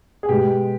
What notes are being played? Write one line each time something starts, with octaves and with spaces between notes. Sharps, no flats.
G#4
B2 G#3 G4